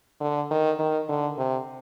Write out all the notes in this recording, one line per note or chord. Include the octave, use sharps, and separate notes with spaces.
D3
D#3
D#3
D3
C3